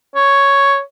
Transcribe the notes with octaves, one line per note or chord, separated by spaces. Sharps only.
C#5